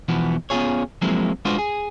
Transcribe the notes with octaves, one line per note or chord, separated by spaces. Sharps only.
E2 B2 E3 F3 B3
B3 C#4 D#4 F4 G#4 C#5
F3 F#3 G#3 A#3 C4 E4
G#3 D4 F4 F#4 B4 C5
G#4